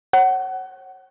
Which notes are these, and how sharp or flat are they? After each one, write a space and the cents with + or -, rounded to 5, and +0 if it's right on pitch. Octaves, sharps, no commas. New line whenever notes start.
C#5 -35 F#5 +25